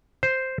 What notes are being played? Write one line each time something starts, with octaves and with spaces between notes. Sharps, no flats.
C5